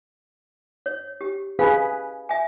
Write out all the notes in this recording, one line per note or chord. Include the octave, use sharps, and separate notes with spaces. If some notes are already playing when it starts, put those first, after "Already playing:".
C#5
G4
G#4 B4 F5 G#5
E5 G#5